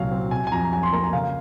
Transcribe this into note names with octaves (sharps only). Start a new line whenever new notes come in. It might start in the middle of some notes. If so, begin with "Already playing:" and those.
Already playing: C2 A#2 F#3 C4 F5
C4
C3 G#5
G#5
F2 A#5
F#3 G#5
C6
A#3 A#5
G#5
C#3 F5